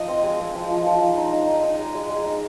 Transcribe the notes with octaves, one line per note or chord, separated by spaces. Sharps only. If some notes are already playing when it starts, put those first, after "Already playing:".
Already playing: F3 D#4 D#5 F5
C4
G#3
C4
F3
F3
F3
D#4
D#4
D#4
D#4
D#4
G#3
G#3
G#3
D#4